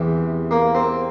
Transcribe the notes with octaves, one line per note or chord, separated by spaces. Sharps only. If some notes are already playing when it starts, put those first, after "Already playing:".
Already playing: E2 C3 E3
A#3
C4